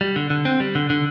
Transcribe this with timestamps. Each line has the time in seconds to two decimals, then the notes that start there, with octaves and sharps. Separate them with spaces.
0.01 G3
0.16 D3
0.30 D3
0.45 C4
0.60 G3
0.75 D3
0.90 D3